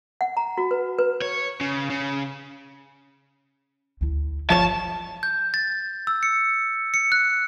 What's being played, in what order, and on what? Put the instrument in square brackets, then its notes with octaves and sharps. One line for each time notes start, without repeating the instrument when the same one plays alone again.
[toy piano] F#5
A#5
F#4
B4
B4
[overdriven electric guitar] C#5
C#3
C#3
[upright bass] D2 E4
[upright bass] G1 [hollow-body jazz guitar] F3 C#5 [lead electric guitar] A5
[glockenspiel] G6
A6
E6
C#7
C#7
F#6